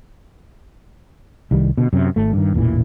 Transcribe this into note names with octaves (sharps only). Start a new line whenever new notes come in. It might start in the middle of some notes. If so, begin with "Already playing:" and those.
C2 D#3 G3
B2 D3
F#2 C3
G#1 A3
G2 D#3
E1 A1 A#2 E3